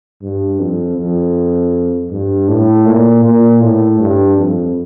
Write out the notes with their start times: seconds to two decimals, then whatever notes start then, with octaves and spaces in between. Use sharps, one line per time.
0.22 G2
0.60 F2
0.97 F2
2.11 G2
2.48 A2
2.86 A#2
3.24 A#2
3.61 A2
4.00 G2
4.37 F2